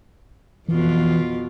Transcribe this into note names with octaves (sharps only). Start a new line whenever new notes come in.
F2 B2 E3 F4